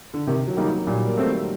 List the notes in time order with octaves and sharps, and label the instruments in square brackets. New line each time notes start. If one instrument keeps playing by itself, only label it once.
[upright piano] D3
[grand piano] C3 [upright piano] D#3
[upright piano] F#3
[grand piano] D#3 G3 A#3 D#4
[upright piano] F#3
[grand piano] A#2 [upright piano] G3
[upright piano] A#3
[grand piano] A3 C4
[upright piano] D#3